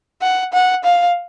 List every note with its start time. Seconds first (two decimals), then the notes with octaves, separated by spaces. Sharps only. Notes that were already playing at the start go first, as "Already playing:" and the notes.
0.22 F#5
0.53 F#5
0.84 F5